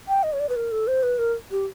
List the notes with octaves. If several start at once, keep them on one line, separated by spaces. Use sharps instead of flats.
G5
D#5
C#5
D5
B4
A#4
A4
C5
B4
A#4
G4